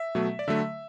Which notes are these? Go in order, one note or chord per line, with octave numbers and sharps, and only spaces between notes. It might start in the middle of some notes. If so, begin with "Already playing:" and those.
Already playing: E5
B2 F#3 A3
D5
D3 F#3 A3 E5